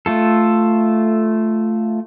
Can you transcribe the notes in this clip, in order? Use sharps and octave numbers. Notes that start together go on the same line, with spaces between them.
A3 F4 A4